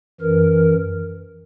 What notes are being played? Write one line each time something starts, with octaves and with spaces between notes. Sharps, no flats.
F#2 E3 A#4